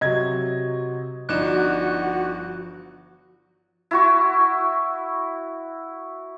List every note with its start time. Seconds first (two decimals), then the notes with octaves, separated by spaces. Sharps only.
0.01 C3 F#3 D#5 G#6
1.29 G1 F3 D4 D#4 F#4 D6 F#6 E7
3.91 E4 F#4 C#6